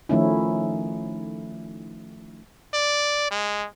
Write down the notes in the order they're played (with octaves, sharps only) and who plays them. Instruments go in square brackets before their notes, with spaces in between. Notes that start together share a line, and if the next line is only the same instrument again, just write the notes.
[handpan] D#3 F3 A3 C#4 D#4 E4
[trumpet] D5
G#3